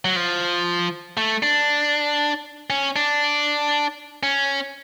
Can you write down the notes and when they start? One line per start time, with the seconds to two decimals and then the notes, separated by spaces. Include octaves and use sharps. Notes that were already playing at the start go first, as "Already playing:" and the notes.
0.05 F#3
0.16 F3
1.17 A3
1.43 D4
2.70 C#4
2.96 D4
4.23 C#4